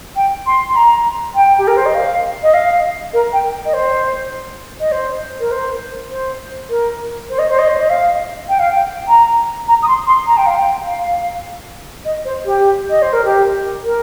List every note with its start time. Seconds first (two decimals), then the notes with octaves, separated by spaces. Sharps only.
0.15 G5
0.46 C6
0.68 C6
0.75 A#5
1.34 G5
1.58 G4
1.67 A#4
1.76 C5
1.85 D#5
1.94 F5
2.42 D#5
2.53 F5
3.13 A#4
3.32 G5
3.65 D#5
3.73 C5
4.80 D#5
4.91 C5
5.40 A#4
5.51 C5
6.10 C5
6.69 A#4
7.29 C5
7.38 D#5
7.49 C5
7.58 D#5
7.67 C5
7.79 D#5
7.89 F5
8.48 G5
8.59 F5
8.70 G5
9.08 A#5
9.68 A#5
9.82 D#6
9.87 C6
10.06 C6
10.26 A#5
10.37 G5
10.46 F5
10.55 G5
10.86 F5
12.04 D#5
12.24 C5
12.45 G4
12.89 D#5
13.02 C5
13.12 A#4
13.24 G4
13.84 A#4